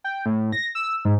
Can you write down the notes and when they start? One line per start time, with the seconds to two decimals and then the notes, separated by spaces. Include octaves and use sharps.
0.04 G5
0.26 A2
0.53 A#6
0.75 E6
1.05 G#2